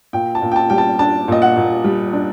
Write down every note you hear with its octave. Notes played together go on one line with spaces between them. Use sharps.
A#2 G5
A5
A#2
G5
A5
G3 G5
A5
D4 A5
A#2 D#5
F#5
A#2
G3
D4